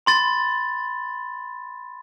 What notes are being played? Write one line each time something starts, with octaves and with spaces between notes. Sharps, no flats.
B5 C6 A6